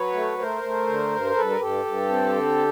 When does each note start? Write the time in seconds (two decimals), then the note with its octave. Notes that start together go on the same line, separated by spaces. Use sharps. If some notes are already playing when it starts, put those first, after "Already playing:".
Already playing: F#3 B4 C#5
0.13 A3
0.38 A3 A#4 C5
0.63 A3
0.87 D3
1.11 G2
1.36 G2 A4 B4
1.51 A#4
1.60 G2 G4 A4
1.85 G2
2.09 C4
2.34 D3